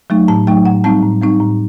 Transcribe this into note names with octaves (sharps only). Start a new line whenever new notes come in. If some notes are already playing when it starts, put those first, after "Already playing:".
F#3 A3 D#4
A2 A5
F#3 A3 D#4 G5
A2 F#5
G3 C4 D#4 A5
A2
G3 C4 D#4
A2